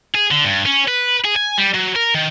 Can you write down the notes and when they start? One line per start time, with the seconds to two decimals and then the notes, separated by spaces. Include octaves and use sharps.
0.15 G#4
0.31 D3
0.44 G2
0.66 C#4
0.88 B4
1.24 G#4
1.36 G#5
1.58 G3
1.74 F#3
1.96 A#4
2.15 D#3